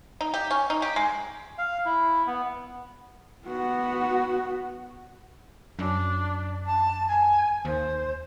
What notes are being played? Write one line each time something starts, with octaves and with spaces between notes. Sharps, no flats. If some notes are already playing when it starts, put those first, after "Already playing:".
D#4
G4
C#4
D#4
G4
G#3
F5
E4
B3
B3 F#4
F#2 D4
A5
G#5
D#2 C5